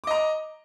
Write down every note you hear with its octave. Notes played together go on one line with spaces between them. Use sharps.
D#5 A#5 D6